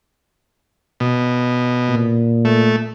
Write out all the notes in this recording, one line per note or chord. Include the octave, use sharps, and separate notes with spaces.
B2
A#2
A3